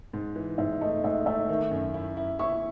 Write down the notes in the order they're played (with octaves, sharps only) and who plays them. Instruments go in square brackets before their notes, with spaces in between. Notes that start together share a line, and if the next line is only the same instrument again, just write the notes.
[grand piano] G#2
E3
[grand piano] G#2 [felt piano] E5
[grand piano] A3 [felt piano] D#5
[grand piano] G#2 [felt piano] E5
[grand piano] A3 [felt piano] E5
[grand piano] D#3
F#2
E4
E4
[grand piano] E4 [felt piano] C#6